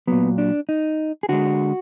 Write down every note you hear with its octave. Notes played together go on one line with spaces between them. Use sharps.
A#2 F#3 B3
D4
D#4
G#4
D3 G#3 F#4